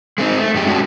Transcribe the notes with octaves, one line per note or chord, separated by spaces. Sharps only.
G#3 A3 C4 D#4
A3
F#2 G#3 G4
G#3 C#4 D4 F#4